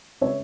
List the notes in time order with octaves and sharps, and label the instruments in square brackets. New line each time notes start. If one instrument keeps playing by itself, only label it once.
[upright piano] C#3 G#3 C#4 C#5 E5